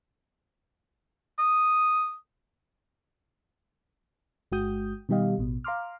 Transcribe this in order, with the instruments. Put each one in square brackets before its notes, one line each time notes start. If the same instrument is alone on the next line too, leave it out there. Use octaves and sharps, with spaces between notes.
[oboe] D#6
[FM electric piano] G1 G#3 F#4 G5 D#6 G6
B2 D#3 G3 G4 D#5 F5
A1 B2
F5 A#5 C6 D6 F6